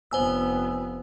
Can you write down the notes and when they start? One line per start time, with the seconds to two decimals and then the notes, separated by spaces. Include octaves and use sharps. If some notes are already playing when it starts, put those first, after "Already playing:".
0.11 F1 B3 C5 G#5 E6